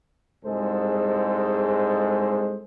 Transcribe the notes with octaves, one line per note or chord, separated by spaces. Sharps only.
C2 G#2 G#3 G#4 A4 C5